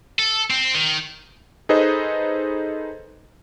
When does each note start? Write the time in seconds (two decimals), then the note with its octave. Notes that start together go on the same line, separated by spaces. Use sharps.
0.19 A4
0.50 C4
0.75 D#3
1.69 D#4 G#4 A4 B4 C5 D#5